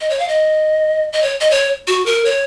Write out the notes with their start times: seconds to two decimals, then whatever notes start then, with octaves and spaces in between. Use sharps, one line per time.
0.01 D#5
0.10 C#5
0.19 F5
0.28 D#5
1.13 D#5
1.22 C#5
1.41 D#5
1.51 C#5
1.87 F#4
2.06 A#4
2.25 C#5